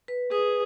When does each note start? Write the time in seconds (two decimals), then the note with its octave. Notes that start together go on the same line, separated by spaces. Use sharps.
0.08 B4
0.31 G#4 B4